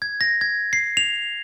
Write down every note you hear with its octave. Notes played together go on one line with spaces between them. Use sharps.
G#6
A#6
G#6
C7
F7